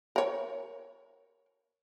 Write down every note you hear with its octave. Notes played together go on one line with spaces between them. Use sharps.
A#4 C#5